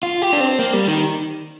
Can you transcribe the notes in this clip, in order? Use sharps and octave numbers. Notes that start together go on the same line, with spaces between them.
F4
G4
D4
C4
A#3
G3
D#3